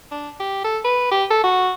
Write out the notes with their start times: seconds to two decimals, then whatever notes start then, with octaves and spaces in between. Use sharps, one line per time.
0.11 D4
0.40 G4
0.65 A4
0.85 B4
1.12 G4
1.30 A4
1.44 F#4